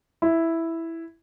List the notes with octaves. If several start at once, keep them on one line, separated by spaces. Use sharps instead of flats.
E4